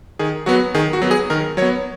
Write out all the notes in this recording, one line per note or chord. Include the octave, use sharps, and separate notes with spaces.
D#3 G#4
F#3 B3 F#4
D#3 G#4
F#4
F#3 B3
G#4
D#3 A#4
F#3 C#5
B3